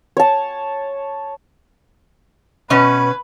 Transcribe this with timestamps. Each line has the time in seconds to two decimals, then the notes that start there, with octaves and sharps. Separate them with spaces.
0.17 C#5 A5
2.70 B2 C#4 B4